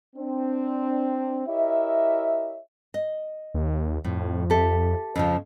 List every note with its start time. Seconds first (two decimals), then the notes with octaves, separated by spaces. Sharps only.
0.16 C4 D4
1.47 E4 G4 A#4 C#5 D#5 E5
2.94 D#5
3.54 D#2
4.04 F2 A2
4.50 G4 A4 E5
5.16 F2 C#3 F3